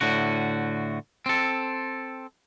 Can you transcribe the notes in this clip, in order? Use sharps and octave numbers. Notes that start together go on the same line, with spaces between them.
A2 D3 F#4
C4 A4